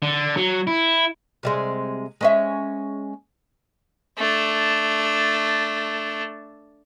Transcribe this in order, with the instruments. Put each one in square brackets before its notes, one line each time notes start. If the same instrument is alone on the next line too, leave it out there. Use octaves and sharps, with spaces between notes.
[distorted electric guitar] D3
F#3
E4
[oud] C3 G3 G#3
G#3 C#4 E5
[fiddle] A3 D4